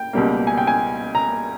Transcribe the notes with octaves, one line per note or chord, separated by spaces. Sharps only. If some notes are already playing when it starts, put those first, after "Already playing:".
Already playing: G5
C#2 B2 G3 A#3
G#5
G5
G#5
A#5